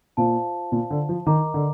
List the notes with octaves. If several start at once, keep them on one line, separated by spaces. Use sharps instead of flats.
A#2 F4 C5 F5 A5
A#2
D3
F3
D#3 A#4 D#5 A#5 D6
D3